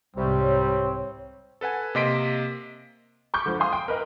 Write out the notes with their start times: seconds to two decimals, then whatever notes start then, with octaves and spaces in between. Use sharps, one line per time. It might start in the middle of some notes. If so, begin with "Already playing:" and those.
0.16 C2 G#2 C3 G3 C4 C#5
1.61 A4 B4 F#5 G#5
1.95 C3 A#3 D#5 C6 B6 D7
3.34 B5 C#6 D6 G6
3.46 D3 F3
3.60 F5 G#5 C6 D#6
3.73 G5
3.88 A#4 B4 D#5